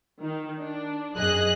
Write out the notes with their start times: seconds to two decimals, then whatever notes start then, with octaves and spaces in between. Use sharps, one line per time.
0.22 D#3
0.61 D4
1.16 F#2 G#4 D#5 F#6